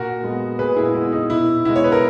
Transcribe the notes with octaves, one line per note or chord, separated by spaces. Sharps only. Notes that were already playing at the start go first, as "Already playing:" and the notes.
Already playing: A#2 F#4 A#4
G#3 B3
A#2 G#4 B4
E4 G#4
G#3 B3 E4
D#4
B2 E4
G#3 B3 E4
C#5
B4
A#4